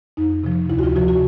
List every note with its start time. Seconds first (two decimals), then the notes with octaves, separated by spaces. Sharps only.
0.17 F2 D#4
0.44 C3 F3
0.70 D2 E4
0.79 F#4
0.83 F4
0.96 C3 F3 F#4
1.08 F#4